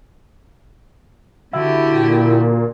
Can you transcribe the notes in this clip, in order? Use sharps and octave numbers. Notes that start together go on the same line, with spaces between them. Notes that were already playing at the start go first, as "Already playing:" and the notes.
D3 E4 F#4 G4
A#2